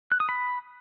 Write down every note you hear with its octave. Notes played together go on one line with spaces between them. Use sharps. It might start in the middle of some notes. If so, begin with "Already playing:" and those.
F#6
D#6
B5